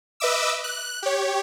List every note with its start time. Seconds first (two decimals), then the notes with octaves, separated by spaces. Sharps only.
0.20 B4 D#5 E5 D6 E6
0.64 F#6
1.02 G4 C#5